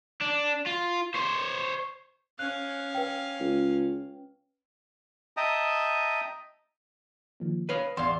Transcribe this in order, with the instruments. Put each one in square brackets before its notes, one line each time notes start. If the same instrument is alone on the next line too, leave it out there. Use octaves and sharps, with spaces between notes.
[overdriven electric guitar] D4
F4
C5 C#5
[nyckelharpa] C#4 F5 [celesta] F#6
[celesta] B4 G5
[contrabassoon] C#2
[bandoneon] D#5 E5 G5 A5 A#5 D#6
[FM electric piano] D#3 F3 A#3
[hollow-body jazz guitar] B4 F5 [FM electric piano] C#5 D#6
[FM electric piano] A1 D5 F#5 [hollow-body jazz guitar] E2 [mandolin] F4 C5